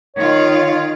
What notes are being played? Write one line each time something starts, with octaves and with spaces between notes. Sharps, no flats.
D#3 F4 C#5